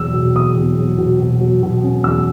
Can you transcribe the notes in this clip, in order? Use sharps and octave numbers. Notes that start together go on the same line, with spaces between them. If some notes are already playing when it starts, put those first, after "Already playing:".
Already playing: E2 B2 F#3 E6
B2
E2 D#6
E2
F#3
B2
B2
F#3
B2
C#4
E2 E6